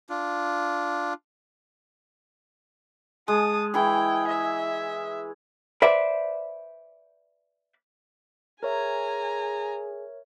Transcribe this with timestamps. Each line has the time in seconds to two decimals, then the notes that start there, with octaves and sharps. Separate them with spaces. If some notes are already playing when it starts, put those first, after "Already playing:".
0.09 D4 F4
3.28 G#3 A5 D#6
3.74 E3 E4 G#4 G5
4.27 E5
5.82 B4 C5 D5 E5
8.63 G#4 A#4 C#5 E5 G#5 A#5